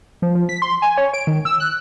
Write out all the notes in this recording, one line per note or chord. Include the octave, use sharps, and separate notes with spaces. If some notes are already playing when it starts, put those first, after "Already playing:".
F3
F3
B6
C6
G#5
C#5
D7
D#3
E6
F#6